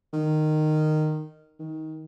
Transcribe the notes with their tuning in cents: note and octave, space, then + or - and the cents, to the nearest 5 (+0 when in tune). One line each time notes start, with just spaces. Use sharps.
D#3 -15
D#3 +20